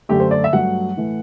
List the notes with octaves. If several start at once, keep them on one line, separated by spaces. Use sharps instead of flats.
F#2 D3 A3 G4
C5
D5
E5
G2 F#3 A3 F#5
A2 E3 A3